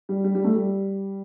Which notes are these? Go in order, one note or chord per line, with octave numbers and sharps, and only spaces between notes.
G3
G3
G3
A3
G3